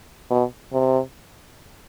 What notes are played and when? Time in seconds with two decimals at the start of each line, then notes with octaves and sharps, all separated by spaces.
0.30 B2
0.73 C3